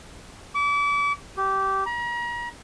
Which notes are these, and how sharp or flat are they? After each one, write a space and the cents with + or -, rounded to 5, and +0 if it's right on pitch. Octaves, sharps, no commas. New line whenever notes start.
D6 -35
G4 -15
A#5 +40